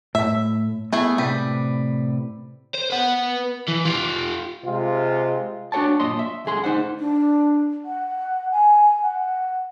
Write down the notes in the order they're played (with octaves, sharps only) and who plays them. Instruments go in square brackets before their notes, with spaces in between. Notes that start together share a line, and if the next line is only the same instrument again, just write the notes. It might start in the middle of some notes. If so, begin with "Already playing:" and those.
[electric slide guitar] A2 [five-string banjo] E5
[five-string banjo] A3 E4 G#4 [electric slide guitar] B3
[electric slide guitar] A2 C3 B4 [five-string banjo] G3
[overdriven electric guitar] C5
B4 F#5
E3
F4 G4
[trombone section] C3 G#3 F4
[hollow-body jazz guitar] D4 F#4 A4 C#5 G5 A5
F#2 A#2 D#5 C6
E5
C#2 F#2 G#4 C6
D2 D#4 C5 F#5
[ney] D4
F#5
G#5
F#5